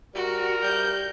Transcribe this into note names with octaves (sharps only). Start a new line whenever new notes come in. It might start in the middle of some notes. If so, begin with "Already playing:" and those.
G3 F#4 A#4
G3 G6